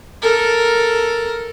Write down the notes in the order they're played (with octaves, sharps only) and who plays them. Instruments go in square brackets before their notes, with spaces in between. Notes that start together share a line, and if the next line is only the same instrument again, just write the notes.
[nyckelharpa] A4 A#4